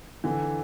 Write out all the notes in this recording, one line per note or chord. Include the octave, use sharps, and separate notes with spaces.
D3 E3